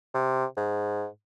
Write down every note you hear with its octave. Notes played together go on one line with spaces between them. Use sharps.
C3
G#2